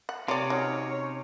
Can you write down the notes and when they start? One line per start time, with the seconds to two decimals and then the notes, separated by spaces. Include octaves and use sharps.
0.09 F#5
0.28 C3 F4 C#5 D5
0.50 C#4 D#4 F#4